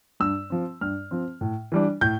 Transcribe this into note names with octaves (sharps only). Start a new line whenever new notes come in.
G2 E6
F3 C4
G2 F6
F3 C4
A2
E3 G3 D4
A2 G6